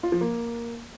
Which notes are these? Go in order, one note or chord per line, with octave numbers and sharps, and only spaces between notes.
F4
F3
A#3